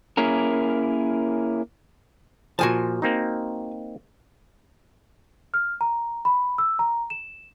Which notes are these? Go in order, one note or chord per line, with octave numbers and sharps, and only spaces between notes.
A#3 C#4 E4 G#4 A#4
A#2 F3 F#4 G#5 A5
A#3 C4 D#4
F6
A#5
B5
E6
A#5
E7